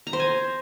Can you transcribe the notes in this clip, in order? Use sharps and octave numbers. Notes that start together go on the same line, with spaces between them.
A#5
C5
G#5